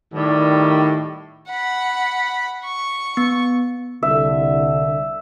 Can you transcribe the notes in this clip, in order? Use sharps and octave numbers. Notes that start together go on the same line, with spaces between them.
A2 D#3 G3
F#5 B5
C#6
B3
C2 D3 E5